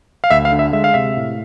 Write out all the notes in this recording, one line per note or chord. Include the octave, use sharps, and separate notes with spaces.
F5
D2 E5
F5
D3
E5
G#3 E5
F5
C3 E5
A2